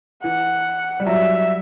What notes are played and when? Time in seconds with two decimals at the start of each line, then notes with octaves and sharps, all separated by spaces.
0.23 E3 F#5
1.00 G3
1.07 F#3 E5